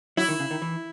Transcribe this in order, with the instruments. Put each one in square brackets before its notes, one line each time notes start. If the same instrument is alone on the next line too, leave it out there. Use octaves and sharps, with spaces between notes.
[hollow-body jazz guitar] F#3 [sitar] E4
[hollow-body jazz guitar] D#3
C#3
D#3
E3